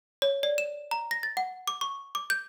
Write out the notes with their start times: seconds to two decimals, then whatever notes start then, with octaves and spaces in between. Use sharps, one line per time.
0.22 C#5
0.43 D5
0.58 E7
0.91 A#5
1.11 A#6
1.23 A6
1.37 F#5
1.68 D6
1.81 C#6
2.15 D6
2.30 G6